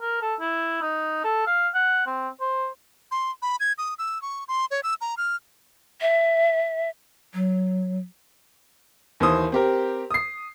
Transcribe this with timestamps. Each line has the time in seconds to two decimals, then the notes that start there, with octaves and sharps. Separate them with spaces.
0.01 A#4
0.22 A4
0.40 E4
0.82 D#4
1.24 A4
1.47 F5
1.74 F#5
2.06 C4
2.40 C5
3.11 C6
3.42 B5
3.60 G#6
3.78 D#6
3.98 E6
4.22 C#6
4.48 C6
4.71 C#5
4.83 E6
5.01 A#5
5.17 F6
6.01 E5
7.33 F#3
9.20 D#2 E3 C5 D#6
9.52 C4 G4 A#4
10.11 D#6 C7